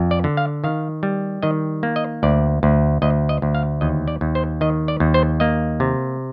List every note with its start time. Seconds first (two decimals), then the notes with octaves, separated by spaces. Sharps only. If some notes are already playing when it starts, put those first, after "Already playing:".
Already playing: F2
0.11 D5
0.24 D3
0.37 F5
0.64 D#3 F5
1.03 G3
1.43 D#3 D#5
1.83 A#3
1.96 D#5
2.23 D2 D5
2.63 D2
3.02 D2 D#5
3.29 D#5
3.42 D2
3.55 F5
3.81 D#2 D#5
4.08 D5
4.21 D#2
4.35 C5
4.61 D#3 D#5
4.88 D5
5.00 D#2
5.14 C5
5.40 A#3 D#5
5.80 C3